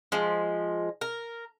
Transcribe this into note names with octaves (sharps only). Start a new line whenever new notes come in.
F3 G#3
A#4